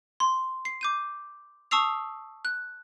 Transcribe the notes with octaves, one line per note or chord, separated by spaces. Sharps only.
C6
C7
D6 G6 D#7
A5 C#6 D#6 E6 C7 F7
F#6